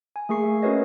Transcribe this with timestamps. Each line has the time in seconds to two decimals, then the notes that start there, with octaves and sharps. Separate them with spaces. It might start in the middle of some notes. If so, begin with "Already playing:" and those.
0.16 G#5
0.29 A3 A#3 G#4 C#6 C7
0.44 E5
0.62 C#4 F#4 A#4 B4 C#5 D#5